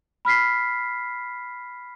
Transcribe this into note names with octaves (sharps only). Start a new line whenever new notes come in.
B5 F6 B6 C7